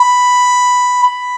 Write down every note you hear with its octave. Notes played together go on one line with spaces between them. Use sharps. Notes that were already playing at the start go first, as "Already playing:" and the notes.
Already playing: B5
B5